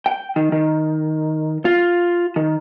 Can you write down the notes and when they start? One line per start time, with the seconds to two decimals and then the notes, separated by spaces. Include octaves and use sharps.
0.06 G5
0.36 D#3
0.52 D#3
1.65 F4
2.36 D#3